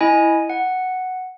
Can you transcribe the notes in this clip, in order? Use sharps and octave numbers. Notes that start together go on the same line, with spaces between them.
E4 D#5 G#5
F#5